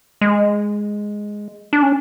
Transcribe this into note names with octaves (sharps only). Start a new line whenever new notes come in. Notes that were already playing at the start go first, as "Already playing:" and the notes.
G#3
D4
C#4